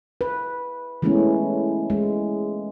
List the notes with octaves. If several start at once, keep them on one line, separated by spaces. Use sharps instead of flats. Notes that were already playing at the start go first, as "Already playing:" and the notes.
B4
E3 G#3 A3 B3 C#4
G#3